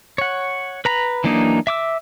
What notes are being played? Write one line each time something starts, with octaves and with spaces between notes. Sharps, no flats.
C#5 F#5
B4 A#5 B5
E3 F#3 A#3 D4 D#4
E5 D6 E6